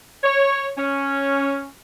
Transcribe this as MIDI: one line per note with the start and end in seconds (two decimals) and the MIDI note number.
0.23 0.68 73
0.78 1.69 61